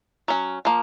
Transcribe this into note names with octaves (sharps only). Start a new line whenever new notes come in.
F#3 C#4
F3 A#3